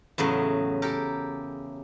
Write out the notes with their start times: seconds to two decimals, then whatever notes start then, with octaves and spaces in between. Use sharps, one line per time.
0.18 E2 A2 C#3 F#3
0.82 G4 A4 A#4